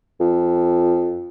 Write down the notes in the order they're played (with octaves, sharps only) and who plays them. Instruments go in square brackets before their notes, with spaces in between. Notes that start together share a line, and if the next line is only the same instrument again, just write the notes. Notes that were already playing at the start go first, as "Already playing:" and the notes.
[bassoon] F2